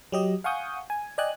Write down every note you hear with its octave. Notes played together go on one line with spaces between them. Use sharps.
F#3 G4 D#5
F5 F#5 G#5 C#6 D#6 G6
G#5
D5 D#5 G5 G#5 F#6